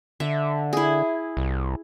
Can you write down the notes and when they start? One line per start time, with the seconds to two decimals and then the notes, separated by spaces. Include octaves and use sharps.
0.20 D3 E5
0.73 E4 G#4
1.37 C2